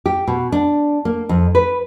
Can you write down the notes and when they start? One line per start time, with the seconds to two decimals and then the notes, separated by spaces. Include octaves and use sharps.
0.06 G4
0.27 B2
0.52 D4
1.05 A#3
1.29 F2
1.55 B4